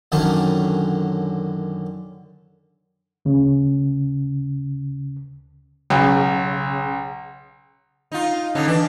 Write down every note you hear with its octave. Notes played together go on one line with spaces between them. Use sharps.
F#2 D3 D#3 C#4 D4
D2 C#3
B1 C#3
D#4 F4
D3 C#4 D#4
E3 D4